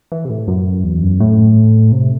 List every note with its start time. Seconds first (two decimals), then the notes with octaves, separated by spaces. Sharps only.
0.12 E3
0.25 C3
0.30 A2
0.48 F#2
0.84 E2
1.02 F#2
1.20 A2
1.92 C3